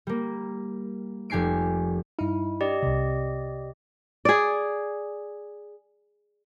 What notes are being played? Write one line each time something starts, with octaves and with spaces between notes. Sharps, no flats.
G3 A#3
F1 G4 G#5 C7 D7
G2 D#4 E4
D4 G4 D5 D#5
C2 C3
G#4 D5